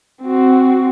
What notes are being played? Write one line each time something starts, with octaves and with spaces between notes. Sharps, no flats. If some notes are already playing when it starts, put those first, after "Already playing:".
C4 F#4